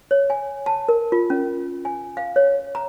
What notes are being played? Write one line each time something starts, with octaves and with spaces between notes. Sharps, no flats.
C#5
G#5
A5
A#4
F4
C#4
G#5
F5
C#5
A#5